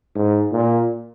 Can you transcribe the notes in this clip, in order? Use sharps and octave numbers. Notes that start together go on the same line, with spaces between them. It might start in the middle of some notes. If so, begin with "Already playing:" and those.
G#2
A#2